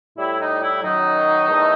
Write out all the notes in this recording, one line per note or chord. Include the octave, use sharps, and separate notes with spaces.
A2 G3 E4
D#4
E4
F#2 D#3 F#3 D#4
E2 D#3 A3